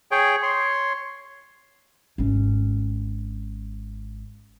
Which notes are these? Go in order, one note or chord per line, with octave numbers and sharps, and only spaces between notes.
G#4 C#5 G5
C#5 C6
G#1 C#4